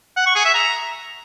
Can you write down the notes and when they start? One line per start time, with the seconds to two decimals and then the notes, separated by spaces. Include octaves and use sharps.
0.17 F#5
0.26 C#6
0.35 G#4
0.45 E5
0.54 A#5